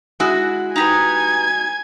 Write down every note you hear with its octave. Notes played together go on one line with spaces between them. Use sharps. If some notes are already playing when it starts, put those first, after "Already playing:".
G#3 E4 F#4
D#4 G4 B4 G#5 G#6